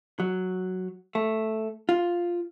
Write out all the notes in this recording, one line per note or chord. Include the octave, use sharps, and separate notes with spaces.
F#3
A3
F4